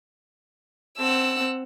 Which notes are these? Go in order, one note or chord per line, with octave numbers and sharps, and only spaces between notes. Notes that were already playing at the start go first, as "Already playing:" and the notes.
C4 F#5 A5 E6